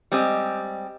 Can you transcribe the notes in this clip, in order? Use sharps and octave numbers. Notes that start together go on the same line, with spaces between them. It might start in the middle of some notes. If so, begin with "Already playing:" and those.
G3 G#3 C4 G4 D#5